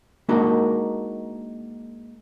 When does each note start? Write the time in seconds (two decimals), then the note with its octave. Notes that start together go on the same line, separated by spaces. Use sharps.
0.29 G#3 A#3 D4 D#4 F#4 A#4